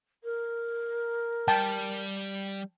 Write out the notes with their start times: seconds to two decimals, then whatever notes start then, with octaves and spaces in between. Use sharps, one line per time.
0.23 A#4
1.48 G3 G5 A5